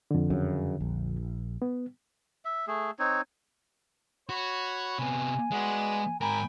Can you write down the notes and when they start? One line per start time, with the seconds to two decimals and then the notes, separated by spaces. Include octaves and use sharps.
0.11 F2 D3
0.30 F#2 C#3
0.81 A#1
1.62 B3
2.45 E5
2.67 A3 G#4
2.99 C4 D#4 C#5
4.29 F#4 C#5 B5
4.99 C3 B3 G#5
5.51 G#3 B3 F#4 D5
6.21 G#2 A#4 G5 G#5 A#5 B5